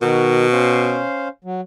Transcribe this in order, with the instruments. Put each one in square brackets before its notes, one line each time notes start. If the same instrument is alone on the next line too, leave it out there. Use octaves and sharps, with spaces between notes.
[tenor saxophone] B2 [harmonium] D#3 F#4 A#4
[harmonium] C#4 C5 F5
F#3